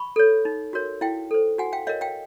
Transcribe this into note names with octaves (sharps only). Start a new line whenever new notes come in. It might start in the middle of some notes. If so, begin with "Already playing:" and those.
Already playing: B5 C#6
A4 C#5
D#4
F#4 A#4 C#5
E4 F5 G5
A4 C5
F#4 F#5 G#5
F5 G5
A#4 C#5 D#5 F5
F5 G5